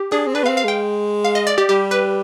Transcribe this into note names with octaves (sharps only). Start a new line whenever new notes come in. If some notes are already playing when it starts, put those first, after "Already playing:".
Already playing: G4
D4 G#4
C4
D4 B4
B3 F5
C4
F5
G#3 G5
F5
D#5
D5
G4
G3 G4
B4